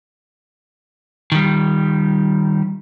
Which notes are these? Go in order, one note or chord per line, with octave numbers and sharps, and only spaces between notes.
D#3 G3